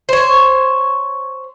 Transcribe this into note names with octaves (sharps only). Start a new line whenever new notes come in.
C5 C#5